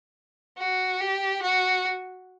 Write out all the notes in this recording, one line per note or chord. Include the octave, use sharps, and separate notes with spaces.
F#4
G4
F#4